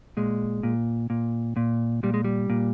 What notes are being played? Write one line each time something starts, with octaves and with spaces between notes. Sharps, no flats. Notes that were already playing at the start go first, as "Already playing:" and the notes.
A#2 G#3
A#2
A#2
A#2
A#2 G3
G#3
G3
A#2